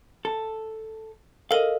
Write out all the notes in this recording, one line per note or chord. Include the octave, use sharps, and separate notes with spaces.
A4
A4 A#4 D#5 F5